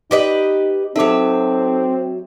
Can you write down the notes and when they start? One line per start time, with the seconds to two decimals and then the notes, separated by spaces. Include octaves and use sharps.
0.11 D#4 G4 B4 D#5
0.96 F#3 C4 D#4 A4 E5 D6